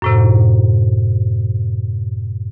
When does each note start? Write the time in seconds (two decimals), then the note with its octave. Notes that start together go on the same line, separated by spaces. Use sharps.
0.02 F#2 A2 C3